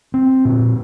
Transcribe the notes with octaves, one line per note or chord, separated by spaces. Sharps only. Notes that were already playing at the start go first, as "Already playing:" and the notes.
C4
A#2